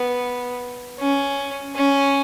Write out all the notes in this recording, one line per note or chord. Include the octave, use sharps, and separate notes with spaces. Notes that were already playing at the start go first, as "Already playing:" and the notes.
Already playing: B3
C#4
C#4